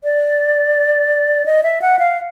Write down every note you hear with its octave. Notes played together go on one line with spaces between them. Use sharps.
D5
D#5
E5
F#5
F5